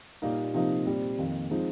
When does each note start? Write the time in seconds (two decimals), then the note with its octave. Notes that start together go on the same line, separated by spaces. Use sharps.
0.22 A#2 G3 A#3 D#4
0.54 C3 F3 A#3 D#4
0.85 A#2 G3 C4
1.18 F2 D#3 A#3
1.50 F3 G#3 C4 D#4